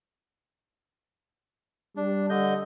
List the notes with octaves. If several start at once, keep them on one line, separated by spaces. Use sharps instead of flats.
G3 D4
D3 D#5 G6